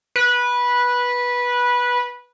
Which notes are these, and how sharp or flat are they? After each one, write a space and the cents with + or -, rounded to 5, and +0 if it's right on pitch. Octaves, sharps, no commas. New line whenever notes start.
B4 -15